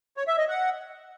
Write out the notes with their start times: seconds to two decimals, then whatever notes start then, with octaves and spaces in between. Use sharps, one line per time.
0.17 C#5
0.27 E5
0.38 D#5
0.48 F#5